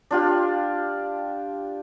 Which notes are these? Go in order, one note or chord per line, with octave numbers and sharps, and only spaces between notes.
D4 F4 G4